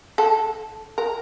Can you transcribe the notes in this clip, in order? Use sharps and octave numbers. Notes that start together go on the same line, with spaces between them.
A4
A#4